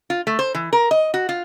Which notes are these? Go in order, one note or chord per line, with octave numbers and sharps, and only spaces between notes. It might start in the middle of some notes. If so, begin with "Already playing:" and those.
F4
A3
C5
E3
A#4
D#5
F#4
F4